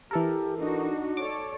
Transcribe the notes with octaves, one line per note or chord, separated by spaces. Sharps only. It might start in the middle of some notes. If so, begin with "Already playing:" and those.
E3 G4 A4 A#4
D4 D#4 F#4
A4 C#5 D5 D6